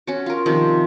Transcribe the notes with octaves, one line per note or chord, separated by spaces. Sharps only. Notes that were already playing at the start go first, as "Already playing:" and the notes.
C#4 F#4
F4 A#4
C3 D#3 F3